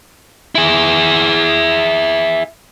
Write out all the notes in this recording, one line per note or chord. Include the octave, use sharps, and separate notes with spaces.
E4 G#4